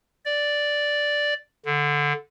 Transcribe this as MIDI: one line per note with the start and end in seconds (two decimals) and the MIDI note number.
0.25 1.34 74
1.66 2.13 50